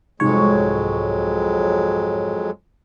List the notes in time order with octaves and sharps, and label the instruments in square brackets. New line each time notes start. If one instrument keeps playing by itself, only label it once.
[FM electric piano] C2 G#2 C#5 [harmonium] F2 F#3 G#3